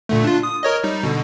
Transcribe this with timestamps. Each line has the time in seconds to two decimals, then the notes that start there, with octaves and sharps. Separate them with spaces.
0.09 A#2 D3 A3
0.24 D4 F4
0.43 D#6
0.63 A#4 C#5 D#5
0.84 G3 D#4
1.03 B2 D3